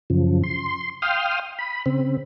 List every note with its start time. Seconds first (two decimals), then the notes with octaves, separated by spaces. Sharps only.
0.10 F#2 C#3 F3
0.44 C6
1.02 F5 G5 C6 D#6 F6
1.59 B5
1.86 C#3 C4